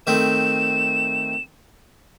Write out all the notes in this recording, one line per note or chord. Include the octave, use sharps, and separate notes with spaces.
D#3 A3 C4 E7